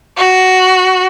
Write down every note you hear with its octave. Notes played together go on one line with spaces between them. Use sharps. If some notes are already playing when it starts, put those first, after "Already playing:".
F#4